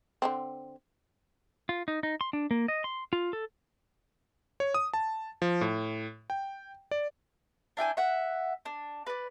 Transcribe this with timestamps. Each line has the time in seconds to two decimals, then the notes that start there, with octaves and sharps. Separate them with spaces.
0.22 D3 E3 C4
1.69 F4
1.88 D#4
2.03 D#4
2.21 C6
2.33 D4
2.51 A#3
2.68 D#5
2.84 C6
3.13 F4
3.33 A4
4.60 C#5
4.74 D#6
4.94 A5
5.42 F3
5.61 A2
6.30 G5
6.91 D5
7.77 D4 E4 G5 G#5
7.97 E5 F#5
8.65 D4
9.06 B4 D5